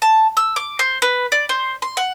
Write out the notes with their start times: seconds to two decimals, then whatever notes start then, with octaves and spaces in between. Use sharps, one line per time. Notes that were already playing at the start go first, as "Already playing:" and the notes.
0.02 A5
0.37 E6
0.56 D6
0.79 C5
1.02 B4
1.32 D5
1.49 C5
1.82 C6
1.97 F#5